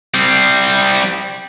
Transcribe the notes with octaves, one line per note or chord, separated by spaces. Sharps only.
G3 C4